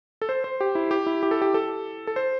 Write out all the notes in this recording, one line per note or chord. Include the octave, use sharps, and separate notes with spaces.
A4
C5
C5
G4
E4
G4
E4
G4
A4
G4
A4
A4
C5